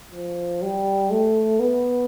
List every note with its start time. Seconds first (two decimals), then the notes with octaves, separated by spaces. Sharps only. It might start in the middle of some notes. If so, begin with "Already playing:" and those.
0.11 F3
0.62 G3
1.11 A3
1.59 B3